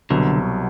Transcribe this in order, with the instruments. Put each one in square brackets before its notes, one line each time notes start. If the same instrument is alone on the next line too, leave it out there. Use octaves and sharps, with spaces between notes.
[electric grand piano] C2 B2 F#3 [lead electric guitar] D3